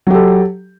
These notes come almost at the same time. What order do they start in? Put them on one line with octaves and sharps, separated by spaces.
F#3 G4 A4